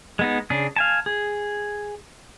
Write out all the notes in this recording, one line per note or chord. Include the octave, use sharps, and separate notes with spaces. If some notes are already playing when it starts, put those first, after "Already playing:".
G#3 B3 D#4
C#3 D4 G#4
F5 G#5 A5
G#4